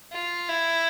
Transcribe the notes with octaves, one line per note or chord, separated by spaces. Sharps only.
F4
E4